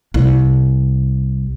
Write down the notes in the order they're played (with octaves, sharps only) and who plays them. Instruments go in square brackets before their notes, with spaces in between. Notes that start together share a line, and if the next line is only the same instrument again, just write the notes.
[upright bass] C2